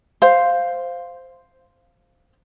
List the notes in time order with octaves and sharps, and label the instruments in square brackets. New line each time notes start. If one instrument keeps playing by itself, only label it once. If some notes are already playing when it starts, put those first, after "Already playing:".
[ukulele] C5 F5